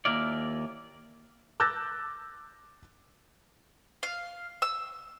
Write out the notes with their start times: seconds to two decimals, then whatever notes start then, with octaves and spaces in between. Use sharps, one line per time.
0.05 D#2 G#2 A#3 E4 F4 D5
1.60 D6 E6 F#6 G6 A6 A#6
4.03 F5
4.62 E6